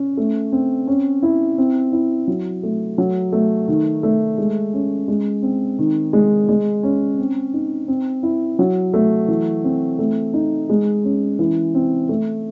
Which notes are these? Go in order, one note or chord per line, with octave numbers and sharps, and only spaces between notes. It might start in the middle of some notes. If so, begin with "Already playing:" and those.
Already playing: C#4
A3
C4
C#4
E4
C4
E4
F#3
A3
F#3
A3
D#3
A3
G#3
C#4
G#3
C4
D#3
G#3
G#3
C#4
C4
D#4
C4
E4
F#3
A3
E3
C4
A3
D#4
G#3
C#4
E3
C4
A3